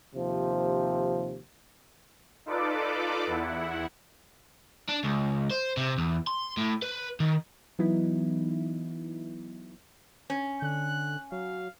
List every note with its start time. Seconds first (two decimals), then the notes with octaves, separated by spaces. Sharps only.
0.15 D#2 C3 F3
2.46 D#4 F4 A4 B4 D5 D6
3.27 E2 E4 F#5
4.89 D4
5.04 C#2
5.51 C5
5.77 C3
5.98 E2
6.27 C6
6.57 A2
6.82 B4
7.20 D#3
7.79 E3 F#3 B3 D#4 E4
10.30 C#4
10.62 D3 F#6
11.32 F#3 F5